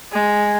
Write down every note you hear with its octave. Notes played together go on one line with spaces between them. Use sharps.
G#3